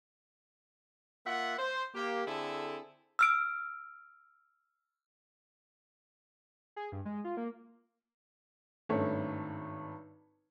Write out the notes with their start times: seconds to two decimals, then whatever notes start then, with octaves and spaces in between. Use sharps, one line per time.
1.26 A#3 F4 E5 F#5
1.59 C5
1.95 A#3 G4
2.26 D3 C4 E4 G#4 A4
3.19 E6 F6 D7
6.76 G#4
6.92 G2
7.05 G#3
7.25 F4
7.37 A#3
8.89 G#1 G2 A3 C#4 C#5